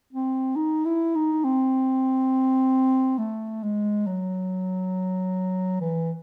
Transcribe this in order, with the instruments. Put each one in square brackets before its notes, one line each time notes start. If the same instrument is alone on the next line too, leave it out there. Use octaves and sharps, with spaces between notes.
[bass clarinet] C4
D#4
E4
D#4
C4
A3
G#3
F#3
E3